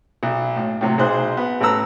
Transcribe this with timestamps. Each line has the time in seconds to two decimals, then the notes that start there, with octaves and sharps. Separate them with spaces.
0.23 B1
0.56 A2
0.81 A2 C3 F#3
0.98 B1 D#4 G#4 C5 F#6
1.37 B3
1.61 A1 A4 B4 A#5 E6